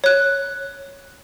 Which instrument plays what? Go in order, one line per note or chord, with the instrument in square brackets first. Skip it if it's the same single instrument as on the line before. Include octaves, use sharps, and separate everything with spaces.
[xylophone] C#5 F#6